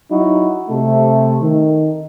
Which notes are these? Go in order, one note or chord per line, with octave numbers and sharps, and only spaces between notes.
F#3 D#4 E4 F#4
C3 A3
D#3